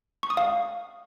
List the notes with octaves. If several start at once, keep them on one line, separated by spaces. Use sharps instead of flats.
C#6
D#6
F5